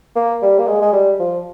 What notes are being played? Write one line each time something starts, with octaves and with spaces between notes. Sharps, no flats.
A#3
G3
A#3
G#3
G#3
G3
F3